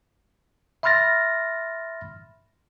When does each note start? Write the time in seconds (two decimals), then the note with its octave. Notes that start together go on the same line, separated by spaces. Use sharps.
0.83 E5 B5 C6 F6 A6 A#6